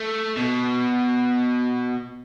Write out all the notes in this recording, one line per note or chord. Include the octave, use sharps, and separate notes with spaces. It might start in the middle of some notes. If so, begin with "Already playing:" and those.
Already playing: A3
B2